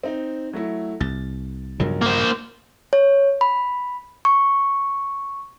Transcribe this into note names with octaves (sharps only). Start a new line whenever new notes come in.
C4 D#4
F#3 A3 E4
C2 A6
B1 G2 C#3 F3 A#4
A#3 C5
C#5
B5
C#6